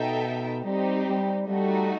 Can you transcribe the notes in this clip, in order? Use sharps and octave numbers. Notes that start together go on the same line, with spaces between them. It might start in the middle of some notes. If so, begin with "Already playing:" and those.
Already playing: B2 D#4 A4 E5 G5
G3 C4 D#4 G4
G3
G3 A3 D#4 F#4